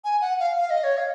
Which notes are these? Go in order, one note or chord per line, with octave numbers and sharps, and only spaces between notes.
G#5
F#5
F5
F5
D#5
C#5
F5